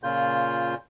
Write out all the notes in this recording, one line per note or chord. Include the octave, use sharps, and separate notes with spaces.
A#2 C#3 F4 G6